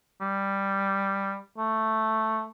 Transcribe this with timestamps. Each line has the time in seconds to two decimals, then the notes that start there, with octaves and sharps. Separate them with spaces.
0.21 G3
1.58 A3